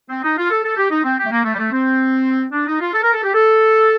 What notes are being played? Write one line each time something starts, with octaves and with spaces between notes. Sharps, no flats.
C4
D#4
F4
A4
A4
G4
D#4
C4
G4
A3
A#3
A3
G3
A3
C4
D4
D#4
F4
A4
A#4
A4
G4
A4